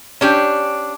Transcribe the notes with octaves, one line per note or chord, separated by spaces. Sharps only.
C#4 D4 G4